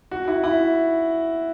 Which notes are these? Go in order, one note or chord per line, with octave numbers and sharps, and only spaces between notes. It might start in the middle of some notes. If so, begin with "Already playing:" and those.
F#4
E4
E4